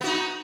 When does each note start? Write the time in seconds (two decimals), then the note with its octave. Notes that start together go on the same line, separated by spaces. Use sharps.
0.01 B3
0.04 F#4
0.07 D#4